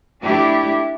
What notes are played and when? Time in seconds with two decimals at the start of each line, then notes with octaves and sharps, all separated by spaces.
0.23 A3 D4 E4 G4